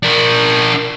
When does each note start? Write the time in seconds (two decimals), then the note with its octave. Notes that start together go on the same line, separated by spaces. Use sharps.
0.03 D4 A#4